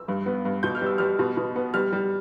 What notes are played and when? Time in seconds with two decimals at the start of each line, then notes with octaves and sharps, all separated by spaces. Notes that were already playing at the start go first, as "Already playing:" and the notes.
Already playing: E6
0.08 G2
0.26 B3
0.45 G2
0.63 B2 G6
0.75 F6
0.81 G3 E6
0.98 G3 F6
1.19 B2
1.37 B2
1.56 B3
1.74 G3 F6
1.92 G3